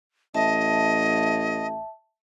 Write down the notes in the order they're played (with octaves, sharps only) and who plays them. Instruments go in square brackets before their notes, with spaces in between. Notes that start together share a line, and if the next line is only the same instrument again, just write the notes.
[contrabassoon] A1 [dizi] D#5 [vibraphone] E5 A5